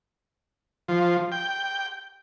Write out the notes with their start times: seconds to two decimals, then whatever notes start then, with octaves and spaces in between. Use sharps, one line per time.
0.88 F3
1.32 G5